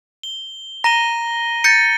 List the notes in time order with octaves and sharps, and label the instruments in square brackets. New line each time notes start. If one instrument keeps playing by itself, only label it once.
[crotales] G7
[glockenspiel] A#5 [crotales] A#6 D#7 G7
[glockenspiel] G6 A#6 C#7 [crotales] A6 D#7